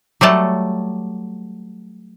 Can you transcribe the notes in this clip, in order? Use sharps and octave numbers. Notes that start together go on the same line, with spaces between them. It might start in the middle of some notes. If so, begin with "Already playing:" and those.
F#3 G3 A3 A5